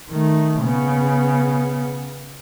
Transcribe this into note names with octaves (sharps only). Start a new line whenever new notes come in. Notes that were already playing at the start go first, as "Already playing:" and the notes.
D#3 A3
C#3 B3